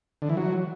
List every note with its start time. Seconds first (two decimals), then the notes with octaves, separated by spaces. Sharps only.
0.22 D3
0.29 E3
0.37 F#3